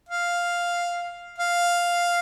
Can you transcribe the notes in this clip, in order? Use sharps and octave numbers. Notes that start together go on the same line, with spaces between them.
F5
F5